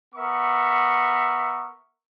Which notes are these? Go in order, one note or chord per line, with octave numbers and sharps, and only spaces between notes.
B3 A#4 E5 C#6